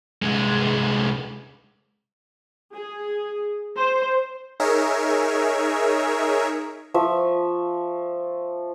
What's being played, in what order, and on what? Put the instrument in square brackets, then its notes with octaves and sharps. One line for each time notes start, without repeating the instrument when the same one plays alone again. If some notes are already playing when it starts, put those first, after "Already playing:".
[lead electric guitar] C2 G#3
[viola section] G#4
C5
[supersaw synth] D#4 G#4 A#4 C#5 E5
[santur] F3 E5 C#6